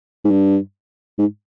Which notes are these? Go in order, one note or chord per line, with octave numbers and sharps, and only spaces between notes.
G#2
G2
G#2